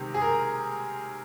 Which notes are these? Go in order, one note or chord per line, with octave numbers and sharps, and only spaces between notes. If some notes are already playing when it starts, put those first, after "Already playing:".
Already playing: C3 D#3 G#3
G#4
A#4